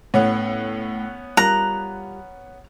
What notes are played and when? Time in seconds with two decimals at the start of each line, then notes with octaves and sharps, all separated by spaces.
0.14 A2 B3 C#4 C#5 F#5
1.37 G3 F4 A#4 A#5 F#6